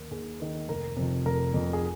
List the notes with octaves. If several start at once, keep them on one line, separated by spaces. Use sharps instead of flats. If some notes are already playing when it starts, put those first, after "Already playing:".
Already playing: D#2 D#3 A#3 A#4
D#2 G#4
D#3 A#3
F1 A#4
F2 C3
F1 A#4
F2 C3
G#4